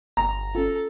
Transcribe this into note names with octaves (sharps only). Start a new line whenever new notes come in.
G1 A#5
C#4 F4 A4